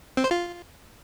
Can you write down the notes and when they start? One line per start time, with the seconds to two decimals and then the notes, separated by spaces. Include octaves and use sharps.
0.17 C4
0.24 C5
0.31 F4